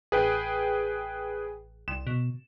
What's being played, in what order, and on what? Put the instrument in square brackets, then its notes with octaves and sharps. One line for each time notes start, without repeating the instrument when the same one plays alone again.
[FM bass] A1 [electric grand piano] G#4 B4 G5
[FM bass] C2 [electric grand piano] E7
[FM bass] B2